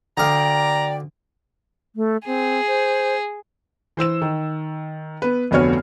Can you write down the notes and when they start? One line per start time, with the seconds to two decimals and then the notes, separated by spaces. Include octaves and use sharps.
0.17 D2 D5 F5 G5 A#5
1.96 A3
2.26 C4 G#4
2.67 C5
3.97 E3 C5 E6 E7
4.22 D#3
5.22 B3 B4
5.51 F1 D2 B3 F#4 C#5 F6